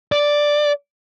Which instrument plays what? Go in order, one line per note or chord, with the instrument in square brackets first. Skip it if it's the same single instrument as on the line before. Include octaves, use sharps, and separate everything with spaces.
[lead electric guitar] D5